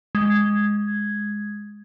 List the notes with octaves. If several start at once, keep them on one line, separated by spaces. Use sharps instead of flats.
G#3 G#6